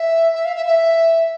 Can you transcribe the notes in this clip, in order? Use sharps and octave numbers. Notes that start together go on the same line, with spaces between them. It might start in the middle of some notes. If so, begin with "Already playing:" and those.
Already playing: E5
E5
F5
E5
E5